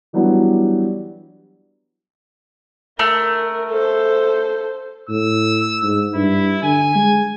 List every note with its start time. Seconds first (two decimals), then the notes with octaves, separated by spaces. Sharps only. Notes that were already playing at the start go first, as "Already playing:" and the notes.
0.13 E3 F#3 G3 B3 D4 E4
2.99 A3 A#4
3.69 A4 C5
5.09 A2 E6
5.83 G#2
6.15 G2 E4
6.63 D3 G#5
6.95 G#3